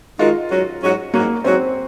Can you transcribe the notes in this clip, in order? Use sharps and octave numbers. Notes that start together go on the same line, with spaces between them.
D#3 G#3 D#4 F4 F#4 A#4
G#2 F#3 C#4 F#4
G#2 F#3 C#4 F#4
G#2 F#3 A#3 C#4 F#4
G#2 F#3 C4 C#4 F#4